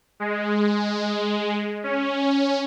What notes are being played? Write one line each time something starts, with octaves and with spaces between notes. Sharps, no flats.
G#3
C#4